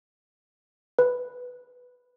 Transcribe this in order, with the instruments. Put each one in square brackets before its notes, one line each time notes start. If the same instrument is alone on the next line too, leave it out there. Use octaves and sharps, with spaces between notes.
[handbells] B4